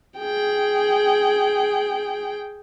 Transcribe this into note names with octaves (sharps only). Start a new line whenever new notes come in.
G#4 G5